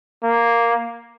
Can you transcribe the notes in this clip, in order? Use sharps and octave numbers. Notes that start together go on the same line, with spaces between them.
A#3